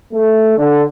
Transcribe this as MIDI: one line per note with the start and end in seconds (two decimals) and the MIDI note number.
0.12 0.54 57
0.57 0.83 50